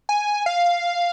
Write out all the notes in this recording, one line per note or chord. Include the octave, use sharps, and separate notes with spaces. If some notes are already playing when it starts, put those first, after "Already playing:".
G#5
F5